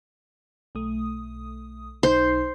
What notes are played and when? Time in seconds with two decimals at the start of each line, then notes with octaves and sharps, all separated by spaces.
0.75 B1 A3 D#6
2.03 B1 D#4 C5 C7